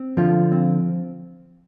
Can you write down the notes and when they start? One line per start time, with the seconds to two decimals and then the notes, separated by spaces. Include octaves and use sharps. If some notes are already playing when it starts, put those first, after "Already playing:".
Already playing: C4
0.17 D3 F3 F4
0.52 C4